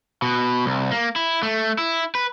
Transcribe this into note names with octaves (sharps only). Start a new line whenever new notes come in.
B2
C2
A#3
E4
A3
E4
B4